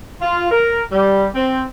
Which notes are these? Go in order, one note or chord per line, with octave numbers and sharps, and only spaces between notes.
F4
A#4
G3
C4